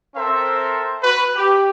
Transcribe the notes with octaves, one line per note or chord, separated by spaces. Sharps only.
C4 A4 A#4 C5 E5
F#4 B4
G4